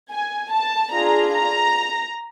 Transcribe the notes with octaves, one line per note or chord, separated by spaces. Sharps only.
G#5
A5
D4 F4 G#4 A#5
A#5